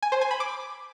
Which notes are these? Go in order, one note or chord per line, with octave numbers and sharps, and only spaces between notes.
G#5
C5
G#5
B5
D6